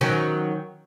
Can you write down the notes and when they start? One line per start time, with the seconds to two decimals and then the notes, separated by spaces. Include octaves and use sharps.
0.01 D#3 F#3 C#4